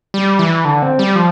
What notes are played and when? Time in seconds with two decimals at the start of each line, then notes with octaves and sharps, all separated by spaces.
0.14 G3
0.39 E3
0.65 D3
0.82 C4
0.99 G3
1.15 F3